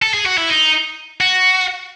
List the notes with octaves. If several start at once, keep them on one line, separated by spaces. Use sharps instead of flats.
A4
G#4
F#4
E4
D#4
F#4